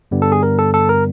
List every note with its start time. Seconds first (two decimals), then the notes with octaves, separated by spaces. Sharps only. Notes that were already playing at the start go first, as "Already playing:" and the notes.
0.11 G2 D3 G3 B3
0.22 A4
0.32 G#4
0.43 A#4
0.59 A4
0.74 A4
0.89 A#4